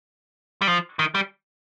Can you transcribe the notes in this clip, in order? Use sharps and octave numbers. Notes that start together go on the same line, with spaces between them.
G3
F3
D#3
G3